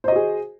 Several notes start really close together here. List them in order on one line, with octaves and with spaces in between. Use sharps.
C5 D#5 F#4 G#4